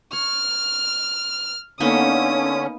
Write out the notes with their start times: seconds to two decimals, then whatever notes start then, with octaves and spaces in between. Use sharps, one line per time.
0.13 C#5 F6
1.80 D3 A#3 B3 C#4 D#4 D#6